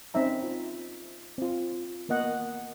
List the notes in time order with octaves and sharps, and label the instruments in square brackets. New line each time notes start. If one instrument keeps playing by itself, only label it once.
[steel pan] C4 C#4 D#4 E5 A#5
F4
C4 F4
A#3 B3 D#5 F#5